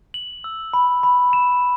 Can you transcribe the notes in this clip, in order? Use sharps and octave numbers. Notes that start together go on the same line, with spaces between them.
F#7
E6
B5
B5
E7